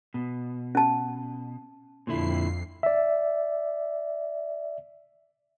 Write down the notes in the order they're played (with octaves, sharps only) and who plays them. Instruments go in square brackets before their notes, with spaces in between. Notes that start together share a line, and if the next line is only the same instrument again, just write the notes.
[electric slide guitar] B2
[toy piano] C#4 A5
[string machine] F2 C7 [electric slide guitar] A#2 D3 E4
[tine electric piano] D5 E5